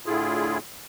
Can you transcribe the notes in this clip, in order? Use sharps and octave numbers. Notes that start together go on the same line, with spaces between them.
A2 D3 E4 F4 G#4